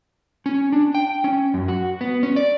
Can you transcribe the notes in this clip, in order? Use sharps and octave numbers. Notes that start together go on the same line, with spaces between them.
C#4
D4
G5
C#4
F#2
F#4
B3
C#4
D5